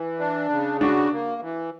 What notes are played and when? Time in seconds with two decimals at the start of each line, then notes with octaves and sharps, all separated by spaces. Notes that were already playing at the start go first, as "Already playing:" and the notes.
Already playing: E3
0.19 D4
0.50 C#3
0.81 D4 F#4
1.12 A#3
1.42 E3